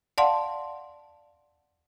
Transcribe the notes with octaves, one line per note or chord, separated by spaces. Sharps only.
D5 F5 F#5 A5 C6